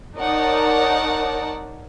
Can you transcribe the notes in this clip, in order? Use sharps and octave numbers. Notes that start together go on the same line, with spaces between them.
D#4 A#4 C#5 D5 F#5 A5